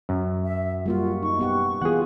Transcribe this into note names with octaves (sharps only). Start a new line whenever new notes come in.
F#2
E5
G3 A#3 F4 F#4
D#4 C#6
B3 G4 F#5
E3 B3 F4 G#4 F#5